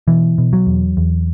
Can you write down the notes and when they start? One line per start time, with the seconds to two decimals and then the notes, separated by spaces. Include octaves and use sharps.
0.08 B2 E3
0.38 B2
0.53 F#3
0.67 E2
0.97 E2